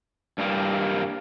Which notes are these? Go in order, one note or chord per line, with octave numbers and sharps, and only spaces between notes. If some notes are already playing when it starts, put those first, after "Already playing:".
G2 G3 A#3